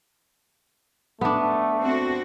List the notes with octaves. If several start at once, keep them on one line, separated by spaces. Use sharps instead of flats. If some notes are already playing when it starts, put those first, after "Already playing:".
A3 B3 D4
C4 F#4